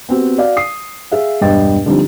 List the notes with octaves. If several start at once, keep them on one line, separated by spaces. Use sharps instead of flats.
B3 C4 F#4 G4
F#4 D5 F5
D#6 C7
G#4 E5 F5
E1 G2 G3 D#5 G5 A6
D3 F3 G3 C4 D#4